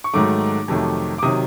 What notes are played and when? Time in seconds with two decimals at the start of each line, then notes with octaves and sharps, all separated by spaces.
0.04 C#6
0.14 G#2 D#3 F#3 A3 D6
0.68 F2 C3 D#3 F#3 A3
1.18 D6
1.22 C3 D#3 F#3 D#6